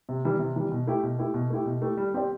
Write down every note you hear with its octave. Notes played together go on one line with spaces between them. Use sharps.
C3
E3 G3
C3
E3 G3
B2
A3 E4 G4
B2
A3 E4 G4
B2
A3 E4 G4
B2
A3 E4 G4
G3
C4 G4 D5